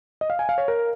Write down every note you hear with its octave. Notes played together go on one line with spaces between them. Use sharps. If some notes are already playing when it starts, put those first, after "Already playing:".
D#5
F5
G#5
F5
C#5
A#4